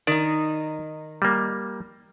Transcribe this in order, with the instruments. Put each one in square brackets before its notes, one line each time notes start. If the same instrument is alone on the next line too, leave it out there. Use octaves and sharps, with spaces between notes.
[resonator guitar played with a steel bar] D#3 D#4 [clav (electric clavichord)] D5
[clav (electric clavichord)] G3 A#3